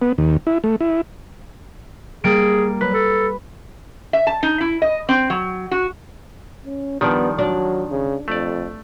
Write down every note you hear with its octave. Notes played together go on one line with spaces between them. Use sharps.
B3
D#2
E4
A3
E4
G3 A#3 G#4 D7
F#3 B4
A4
E5
A5
D#4
E4
D#5
C4
F#3
F#4
C#4
D#3 F3 G3 B3 D4
F#3 D4
C#3
F2 A3 D5